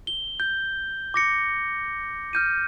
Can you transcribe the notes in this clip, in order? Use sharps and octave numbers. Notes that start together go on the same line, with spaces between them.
G7
G6
D6 A#6 C#7
F6 G6 D#7